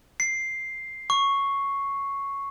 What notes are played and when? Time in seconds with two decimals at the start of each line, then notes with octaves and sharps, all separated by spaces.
0.20 C7
1.10 C#6